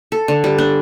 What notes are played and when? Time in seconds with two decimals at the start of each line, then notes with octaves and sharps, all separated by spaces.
0.12 A4
0.28 D3
0.44 G3
0.58 D4